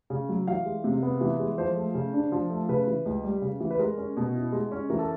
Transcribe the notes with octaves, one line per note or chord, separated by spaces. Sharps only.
C#3
F#3
E3 F5
G#3
C3
B3
E3
G#3
F3 C5
A3
C#3
D4
F3
A3
C#3 B4
E3
C#2
G3
C#3
E3
B4
G#3 A#4
C#4
B2
E4
G#3
C#4
E3 A#4
A4